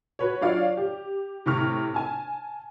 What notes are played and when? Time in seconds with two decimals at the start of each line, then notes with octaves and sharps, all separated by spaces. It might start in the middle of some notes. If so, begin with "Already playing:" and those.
0.19 F#4 B4 C#5
0.41 F#3 D4 F4 C#5 D5 F5
0.77 G4
1.46 A2 C3 C#6 F6
1.94 G#5 A5